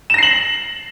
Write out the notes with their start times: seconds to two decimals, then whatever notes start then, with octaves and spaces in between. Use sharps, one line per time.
0.10 E7
0.14 A#6
0.18 C7
0.23 F#7